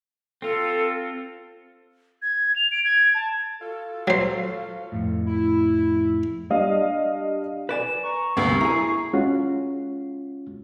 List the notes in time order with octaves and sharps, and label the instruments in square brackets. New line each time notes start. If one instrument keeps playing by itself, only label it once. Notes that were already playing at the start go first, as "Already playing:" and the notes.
[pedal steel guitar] C4 F4 [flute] A4
[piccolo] G#6
F7
D7
G#6
A5
[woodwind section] F4 F#4 A4
[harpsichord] F#3 C5
[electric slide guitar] F2 A2
[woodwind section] E4
[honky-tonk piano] G3 D4 D#5 F5
[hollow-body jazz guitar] B4 D5 G#5 [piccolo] E7
[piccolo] A#5 [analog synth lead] C#6
[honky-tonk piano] D2 C3 A#3 [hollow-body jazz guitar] G2 B3 [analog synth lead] C#6 [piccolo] C7
[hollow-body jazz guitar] E4 G#4 [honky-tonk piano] A#5
[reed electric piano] G#3 C#4 F4 F#4